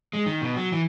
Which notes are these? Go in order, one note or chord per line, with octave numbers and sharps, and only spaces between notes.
G#3
D#3
B2
F#3
E3